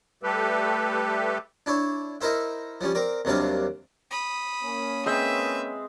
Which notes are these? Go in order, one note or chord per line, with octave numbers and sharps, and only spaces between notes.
G3 A3 G4 A4 B4
D4 E4 C#5
D#4 E4 A#4 C5 E5
F3 G3 C#4
C4 A#4 D5
D#2 C3 F#3 G3 D4 F5
B5 D#6
A#3 C#4
G#3 C4 B4 E5